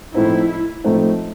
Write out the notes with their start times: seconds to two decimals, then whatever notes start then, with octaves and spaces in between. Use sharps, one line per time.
0.14 A2 F3 A3 C4 D#4 E4
0.84 A2 F3 A3 C4 D#4